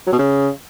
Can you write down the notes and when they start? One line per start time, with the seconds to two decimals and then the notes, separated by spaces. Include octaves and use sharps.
0.07 F#3
0.13 B2
0.19 C#3